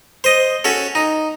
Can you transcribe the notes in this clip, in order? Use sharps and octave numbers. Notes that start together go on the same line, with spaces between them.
C5 D#5
C#4 F#4 A4
D#4